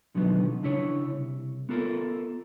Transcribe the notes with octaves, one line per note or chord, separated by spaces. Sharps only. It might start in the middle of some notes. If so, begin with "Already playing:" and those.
B2 D3 D#3 F3 F#3 B3
C#3 D4 E4 C#5
C2
B3 F4 A4 A#4